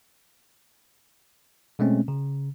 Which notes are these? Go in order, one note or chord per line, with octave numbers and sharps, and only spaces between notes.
B2 G#3 A3 C4 C#4
C#3